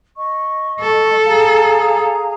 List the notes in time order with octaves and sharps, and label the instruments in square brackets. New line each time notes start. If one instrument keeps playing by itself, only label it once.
[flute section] D#5 C#6
[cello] A4
[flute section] G#4 F5 A#5